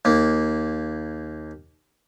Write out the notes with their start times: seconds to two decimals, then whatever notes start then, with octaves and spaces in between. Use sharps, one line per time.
0.05 D#2 A#3